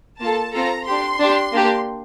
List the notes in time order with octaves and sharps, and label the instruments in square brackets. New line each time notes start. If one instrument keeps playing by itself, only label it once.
[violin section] A#3 F4 A4 A5
C4 F4 A4 A#5
D4 G4 C6
D4 G4
A#3 D4 G4